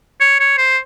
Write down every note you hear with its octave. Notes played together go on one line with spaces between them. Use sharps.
C#5
C#5
C5